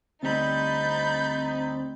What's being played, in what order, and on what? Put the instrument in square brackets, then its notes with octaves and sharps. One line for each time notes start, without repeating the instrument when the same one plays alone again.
[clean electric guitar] D2 G3 [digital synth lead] C4 [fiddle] D#4 [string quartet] B5 G6 A6